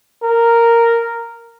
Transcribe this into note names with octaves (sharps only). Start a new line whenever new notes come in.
A#4